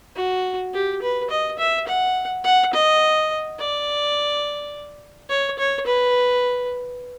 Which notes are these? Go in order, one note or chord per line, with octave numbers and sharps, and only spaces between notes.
F#4
G4
B4
D#5
E5
F#5
F#5
D#5
D5
C#5
C#5
B4